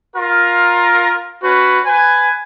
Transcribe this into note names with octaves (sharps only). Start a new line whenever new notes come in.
F4 A#4
C#4 F#4 B4
B4 G#5